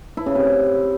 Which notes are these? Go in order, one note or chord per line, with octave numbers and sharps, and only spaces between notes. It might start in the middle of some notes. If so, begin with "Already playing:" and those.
E4
C#3
C3